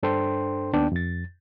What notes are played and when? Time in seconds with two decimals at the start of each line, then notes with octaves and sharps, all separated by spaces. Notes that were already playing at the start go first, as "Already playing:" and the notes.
0.03 G2 D4 A4 C5 G5 C6
0.73 D#2 B3 D4 D5 G5
0.92 F2 A6